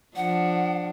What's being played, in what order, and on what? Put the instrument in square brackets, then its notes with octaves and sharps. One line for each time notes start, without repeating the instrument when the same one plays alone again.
[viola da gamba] F3 D4 [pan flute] F#5